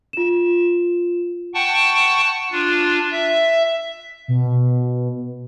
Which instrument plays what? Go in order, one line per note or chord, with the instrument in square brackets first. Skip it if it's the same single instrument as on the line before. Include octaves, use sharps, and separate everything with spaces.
[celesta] F4 E7
[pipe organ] F#5 G5 A5 C#6
D4 F4
E5
[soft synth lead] B2